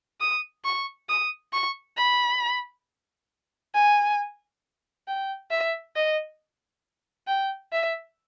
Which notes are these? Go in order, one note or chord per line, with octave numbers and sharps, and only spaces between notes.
D#6
C#6
D#6
C#6
B5
G#5
G5
E5
D#5
G5
E5